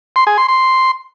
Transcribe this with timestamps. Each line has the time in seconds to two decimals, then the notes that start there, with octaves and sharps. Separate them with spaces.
0.16 C6
0.27 G#4
0.38 C6
0.48 C6